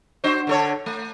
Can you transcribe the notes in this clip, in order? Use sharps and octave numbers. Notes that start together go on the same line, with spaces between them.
D4 F#4 C5
D3 A4 C#5
A3